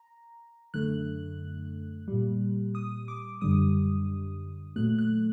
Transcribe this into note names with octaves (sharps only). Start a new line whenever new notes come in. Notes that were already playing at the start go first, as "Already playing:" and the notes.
Already playing: A#5
F#2 D3 A3 F#6
A#2 G3
D#6
D6
F#2 D3 G3 D#6
A#2 F#3 A3 F#6
F#6